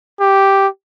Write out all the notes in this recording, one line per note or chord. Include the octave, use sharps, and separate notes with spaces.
G4